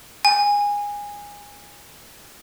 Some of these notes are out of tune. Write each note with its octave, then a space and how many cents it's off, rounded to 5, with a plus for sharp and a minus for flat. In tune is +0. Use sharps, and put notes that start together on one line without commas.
G#5 -20